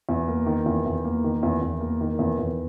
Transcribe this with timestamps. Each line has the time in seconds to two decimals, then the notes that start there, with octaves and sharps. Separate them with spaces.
0.09 E2
0.28 A#3
0.46 D#3
0.66 E2
0.86 E2
1.05 A#3
1.24 D#3
1.43 E2
1.61 E2
1.81 A#3
2.01 D#3
2.19 E2
2.39 E2